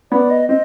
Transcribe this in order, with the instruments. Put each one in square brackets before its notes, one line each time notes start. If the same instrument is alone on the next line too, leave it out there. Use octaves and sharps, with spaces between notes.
[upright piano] B3 [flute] D5
[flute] D#5
[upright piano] C4 [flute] D#5